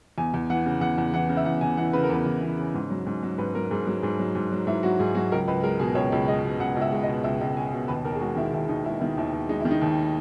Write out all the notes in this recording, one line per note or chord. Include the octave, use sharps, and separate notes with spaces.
E2 G#5
E2
E3 F#5
C#3
E2 F#5
E2
E3 F#5
C#3
E5
E2 F#5
E2 G#5
E3 F#5
C#3 B4
A#4
E2 B4
E2
E3
C#3
G#2
F#3
G#2
F#3
G#2 B4
F#3 A#4
G#2 G#4
F#3 G#4
G#2 G#4
F#3
G#2
F#3
G#2 E4
F#3 F#4
G#2 G#4
F#3 F#4
C#2 A#4
C#2 B4
G#3 A#4
B2 G#4
C#2 C#5
C#2
G#3 D#5
B2
C#2 F#5
C#2 E5
G#3
D#5
B2
C#2 E5
C#2
G#3 G#5
B2
D#2 B4
D#2 A#4
G#4
G#3 F#4
D#3 E4
D#2 E4
D#2 D#4
G#3 E4
D#3 E4
D#2 E4
D#2
G#3 D#4
E4
D#3
D#4
D#2